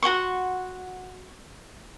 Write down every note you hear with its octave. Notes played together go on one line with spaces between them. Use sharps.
F#4 F#5 C6 C#6